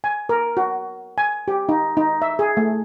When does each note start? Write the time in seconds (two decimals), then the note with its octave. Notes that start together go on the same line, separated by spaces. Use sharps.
0.04 G#5
0.29 A#4
0.57 F#4
1.18 G#5
1.48 G4
1.69 D#4
1.97 D#4
2.22 E5
2.39 G#4
2.57 A3